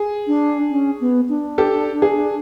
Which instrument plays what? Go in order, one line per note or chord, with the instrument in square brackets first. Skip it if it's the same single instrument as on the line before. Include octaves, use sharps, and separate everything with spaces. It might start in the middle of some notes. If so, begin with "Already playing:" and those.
Already playing: [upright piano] G#4
[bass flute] D4
C#4
B3
D4
[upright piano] G4 A4
G#4